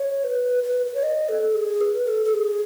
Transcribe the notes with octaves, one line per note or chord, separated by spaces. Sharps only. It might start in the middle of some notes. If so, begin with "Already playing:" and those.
Already playing: C#5
B4
B4
B4
C#5
D#5
A4
G#4
B4
A4
A4
G#4